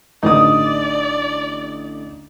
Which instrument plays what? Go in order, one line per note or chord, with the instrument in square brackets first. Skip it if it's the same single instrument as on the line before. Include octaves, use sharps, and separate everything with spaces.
[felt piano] A1 D3 [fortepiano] D#4 D#6 [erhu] D5